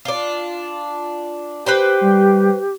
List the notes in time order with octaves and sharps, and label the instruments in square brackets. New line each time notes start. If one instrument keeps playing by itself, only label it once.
[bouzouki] D4 F4
[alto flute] G4 [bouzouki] B4 C5 G5
[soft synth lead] G3